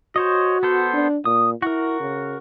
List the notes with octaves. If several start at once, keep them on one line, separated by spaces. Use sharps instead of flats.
F#4 C5 C#5 D#5
B3 A4 C5
D4
A#2 D#6
E4 F#4 A#4
C#3